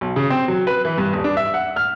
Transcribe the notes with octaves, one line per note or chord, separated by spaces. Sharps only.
B1
C#3
C4
F#3
B4
E3
G2
D#1
D4
E5
F#5
F6